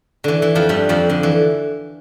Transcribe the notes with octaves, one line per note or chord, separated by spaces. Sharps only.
D3 E3
E3
F2 F3
G2 G3
F2 F3
D3
E3